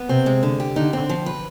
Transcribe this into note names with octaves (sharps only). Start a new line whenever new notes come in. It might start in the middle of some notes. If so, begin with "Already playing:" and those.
Already playing: B3
C3 C4
G#3
D3
G4
D3 D#4
C4
F3
B4